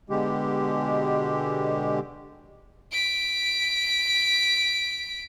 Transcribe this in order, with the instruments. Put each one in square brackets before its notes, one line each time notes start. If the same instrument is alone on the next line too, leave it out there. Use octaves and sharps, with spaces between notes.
[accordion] B2 D3 G#3 G4
[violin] B6 D7